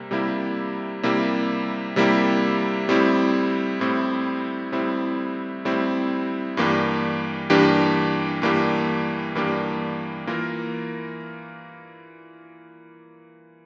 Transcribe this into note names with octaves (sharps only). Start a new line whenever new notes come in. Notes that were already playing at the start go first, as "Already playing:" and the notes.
Already playing: C3 G3 A#3
C3 G3 A#3 E4 G4
C3 G3 A#3 E4 G4
C3 G3 A#3 E4 G4
A2 G3 C4 E4
A2 G3 C4 E4
A2 G3 C4 E4
A2 G3 C4 E4
G2 E3 A#3 D4 G4
G2 E3 A#3 D4 G4
G2 E3 A#3 D4 G4
G2 E3 A#3 D4 G4
E3 A#3 F4 A#4